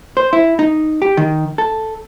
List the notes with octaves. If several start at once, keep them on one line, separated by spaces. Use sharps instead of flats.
C5
E4
D#4
G4
D#3
A4